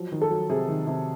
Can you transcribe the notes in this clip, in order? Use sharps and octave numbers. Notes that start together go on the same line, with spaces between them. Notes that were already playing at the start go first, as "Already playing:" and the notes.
Already playing: F3 F#3
D#3
A4
F#3
C3 G#4
D#3
C3